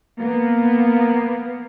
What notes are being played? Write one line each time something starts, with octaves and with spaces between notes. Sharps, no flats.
A#3 B3